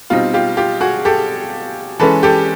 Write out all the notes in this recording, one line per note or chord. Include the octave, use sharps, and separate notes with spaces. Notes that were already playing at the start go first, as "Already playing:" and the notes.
B2 G3 C4 D#4 F4
F4 G4
F4 G4
F#4 G#4
G4 A4
E3 G#3 C#4 A4 B4
G4 A4